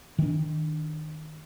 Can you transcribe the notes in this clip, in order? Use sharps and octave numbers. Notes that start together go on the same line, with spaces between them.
D#3 D4